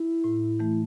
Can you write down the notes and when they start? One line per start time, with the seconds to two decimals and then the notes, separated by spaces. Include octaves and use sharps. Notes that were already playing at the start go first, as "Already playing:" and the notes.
Already playing: E4
0.24 A2
0.59 E3 A3